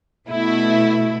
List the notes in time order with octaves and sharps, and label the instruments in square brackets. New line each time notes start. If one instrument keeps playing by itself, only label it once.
[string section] B2 A3 E4